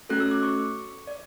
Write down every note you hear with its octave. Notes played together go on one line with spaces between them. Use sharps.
A3 C#4 F#4 A4 F#6
E6
D6
C#6
D5